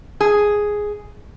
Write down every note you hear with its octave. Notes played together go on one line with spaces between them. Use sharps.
G#4